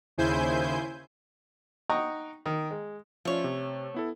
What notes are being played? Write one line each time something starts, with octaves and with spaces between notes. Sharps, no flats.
D#2 C#3 E4 C5 G#5 G6
D#4 F#5 G5 A#5 C#6 D#6
D#3
G#3
F3 A3 C#4 F4 C#5
C3
B3 E4 A4